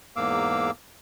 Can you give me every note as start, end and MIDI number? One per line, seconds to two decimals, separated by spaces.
0.16 0.71 40
0.16 0.71 44
0.16 0.71 58
0.16 0.71 77
0.16 0.71 86
0.16 0.71 88